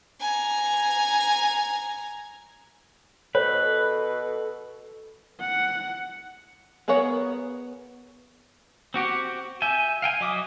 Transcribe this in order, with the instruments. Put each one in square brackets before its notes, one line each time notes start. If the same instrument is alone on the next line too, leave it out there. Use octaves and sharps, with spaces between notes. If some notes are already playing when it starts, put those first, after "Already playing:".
[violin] G#5 A#5
[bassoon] B2 [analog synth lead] A4 [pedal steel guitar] B4 [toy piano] C#5
[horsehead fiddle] F#5
[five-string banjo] B3 G#4 A#4 C#5 F#5
[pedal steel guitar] C4 F#4 G4
E5 G5 G#5
F5 G5 G#5
F#3 D#5 E5 D6 D#6